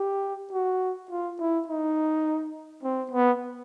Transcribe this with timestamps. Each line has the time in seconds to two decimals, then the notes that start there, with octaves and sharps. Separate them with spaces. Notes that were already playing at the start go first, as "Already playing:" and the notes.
Already playing: G4
0.52 F#4
1.10 F4
1.39 E4
1.68 D#4
2.83 C4
3.12 B3